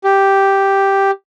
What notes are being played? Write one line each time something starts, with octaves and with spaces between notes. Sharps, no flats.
G4